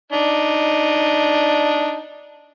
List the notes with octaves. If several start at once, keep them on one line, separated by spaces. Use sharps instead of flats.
D4 D#4